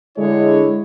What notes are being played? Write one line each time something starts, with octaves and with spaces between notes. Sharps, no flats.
D3 G#3 E4 C#5